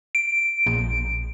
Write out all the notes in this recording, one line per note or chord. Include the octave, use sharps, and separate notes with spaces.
D7
A#1